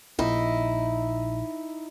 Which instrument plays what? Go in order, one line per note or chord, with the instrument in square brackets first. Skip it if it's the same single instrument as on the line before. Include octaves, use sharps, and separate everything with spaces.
[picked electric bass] A#1 [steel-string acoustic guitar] D#4 E4